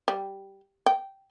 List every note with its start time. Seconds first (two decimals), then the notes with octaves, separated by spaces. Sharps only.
0.08 G3
0.86 G5